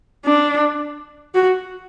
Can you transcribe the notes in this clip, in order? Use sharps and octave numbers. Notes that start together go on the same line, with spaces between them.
D4
F#4